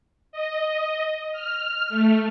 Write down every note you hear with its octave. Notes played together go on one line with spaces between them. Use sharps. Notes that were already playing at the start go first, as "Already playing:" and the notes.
D#5
F6
A3